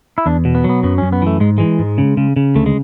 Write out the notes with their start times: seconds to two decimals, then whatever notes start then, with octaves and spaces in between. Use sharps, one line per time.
0.18 E4
0.26 E2 D4
0.45 B2
0.55 B3
0.64 F#3
0.69 B3
0.83 F#2 B3
0.98 F#2 C#4
1.12 B3
1.22 E3 A3
1.40 G#2 G#3
1.58 E3 G#3
1.79 G#2
1.98 C#3
2.17 C#3
2.36 C#3
2.55 D2 A3
2.66 G#3